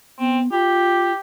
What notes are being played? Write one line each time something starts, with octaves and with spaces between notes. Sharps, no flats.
B3 C4
F4 G4